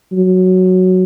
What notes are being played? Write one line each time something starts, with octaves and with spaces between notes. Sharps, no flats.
F#3